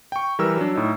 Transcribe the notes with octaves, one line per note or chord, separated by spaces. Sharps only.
G5 C#6
E3 G3 A#4 A#5 E6
F#3 D4
A2 D#4